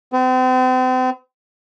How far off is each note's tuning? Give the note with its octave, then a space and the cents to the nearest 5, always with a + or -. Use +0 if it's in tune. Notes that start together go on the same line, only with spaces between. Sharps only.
C4 -40